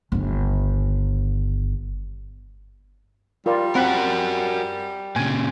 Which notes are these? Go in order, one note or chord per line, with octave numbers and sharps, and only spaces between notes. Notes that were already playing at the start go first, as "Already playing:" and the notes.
G1 D#3
G3 F4 A#4 D5
C4 F#4 A#4 F#5 B5
A#2 C#3 G#5